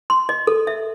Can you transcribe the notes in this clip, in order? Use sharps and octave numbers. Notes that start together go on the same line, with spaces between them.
C6
D#5
A4
E5